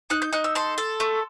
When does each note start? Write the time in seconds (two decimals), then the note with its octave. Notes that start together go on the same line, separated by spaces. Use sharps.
0.10 D#4 F#6
0.22 G6
0.33 D#4 F#6
0.44 E6
0.55 A4 C6
0.78 A4
1.00 A3